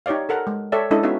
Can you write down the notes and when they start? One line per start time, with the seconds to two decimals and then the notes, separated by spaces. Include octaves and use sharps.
0.06 D#4 G4 C#5 D5 F5
0.29 A4 A#4 F#5 A#5
0.47 G#3
0.72 A4 C#5 D5 E5 G5
0.91 G#3 C#4 D4 E4 A4 D#5
1.03 B3 C#4 D#4 F#4 E5 F5